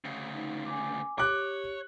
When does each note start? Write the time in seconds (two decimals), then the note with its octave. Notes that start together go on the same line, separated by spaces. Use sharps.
0.05 D2 C#3
0.34 D#4
0.66 G#5 D6
1.18 G4 C#5 D6 F#6